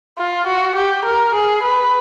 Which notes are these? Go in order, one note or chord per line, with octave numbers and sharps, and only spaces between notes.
F4
F#4
G4
A#4
G#4
B4